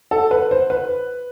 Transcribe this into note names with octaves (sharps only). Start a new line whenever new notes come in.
A4
B4
C5
B4